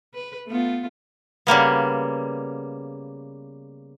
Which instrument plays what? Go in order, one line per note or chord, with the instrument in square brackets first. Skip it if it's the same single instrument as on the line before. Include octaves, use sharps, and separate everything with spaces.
[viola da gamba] B4
A3 B3 F4
[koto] C#3 G3 A#3 B3